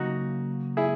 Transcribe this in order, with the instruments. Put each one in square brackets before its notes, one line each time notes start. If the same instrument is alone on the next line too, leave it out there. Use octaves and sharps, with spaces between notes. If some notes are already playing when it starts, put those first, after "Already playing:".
Already playing: [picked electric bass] C#3 F#3 A#3 [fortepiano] D#4 F#4
[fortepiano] E4 G#4